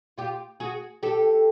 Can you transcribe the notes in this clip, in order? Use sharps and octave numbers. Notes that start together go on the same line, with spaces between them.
F4 G4
F#4 G#4
G4 A4